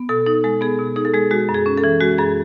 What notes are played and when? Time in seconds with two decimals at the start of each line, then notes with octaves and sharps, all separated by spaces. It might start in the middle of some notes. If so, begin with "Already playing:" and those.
Already playing: B3
0.09 B2 A4
0.26 D#4 A4
0.44 G#3 A4
0.61 B3 G#4
0.79 B2
0.96 D#4 G#4
1.05 A4
1.14 G#3 G#4
1.31 G#3 F#4
1.49 F#2
1.54 G#4
1.66 C#4
1.77 A4
1.84 E3
2.01 G#3 F#4
2.18 F#2 G#4